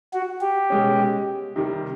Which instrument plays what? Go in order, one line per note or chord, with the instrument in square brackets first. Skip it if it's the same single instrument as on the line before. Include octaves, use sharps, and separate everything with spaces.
[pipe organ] F#4
G4
[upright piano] B2 G#3 C#4
C3 D#3 G3